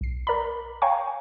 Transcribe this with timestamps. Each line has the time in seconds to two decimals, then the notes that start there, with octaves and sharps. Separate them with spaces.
0.01 B1 C7
0.27 A#4 D5 A#5 B5
0.82 C#5 F5 G5 G#5 A#5 C#6